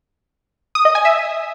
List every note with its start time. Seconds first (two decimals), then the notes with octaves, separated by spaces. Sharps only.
0.75 D#6
0.85 D#5
0.95 G#5
1.05 E5